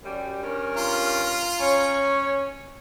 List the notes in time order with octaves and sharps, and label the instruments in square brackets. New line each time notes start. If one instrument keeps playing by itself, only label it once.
[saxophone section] F#2 G3
G2 C#4 A#4
[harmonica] F4 A#5
[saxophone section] C#4 C#5